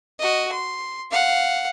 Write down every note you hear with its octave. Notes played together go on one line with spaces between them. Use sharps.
F#4 D#5
C6
F5 F#5